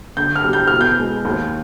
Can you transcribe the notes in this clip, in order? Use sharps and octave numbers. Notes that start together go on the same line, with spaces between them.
D3 G6
F6
G3
G6
B2 F6
G6
G#3
D#2